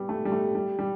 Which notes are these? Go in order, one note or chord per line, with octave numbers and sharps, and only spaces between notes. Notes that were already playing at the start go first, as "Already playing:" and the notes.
Already playing: G3 B3
A3
G3
A3
G3
G3